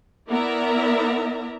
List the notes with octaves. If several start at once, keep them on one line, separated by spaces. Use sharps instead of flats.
B3 E4 A#4 D5 E5 A#5